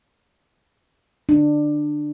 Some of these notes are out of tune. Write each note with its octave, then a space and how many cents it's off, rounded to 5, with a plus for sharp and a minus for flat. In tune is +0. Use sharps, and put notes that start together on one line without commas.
D4 +15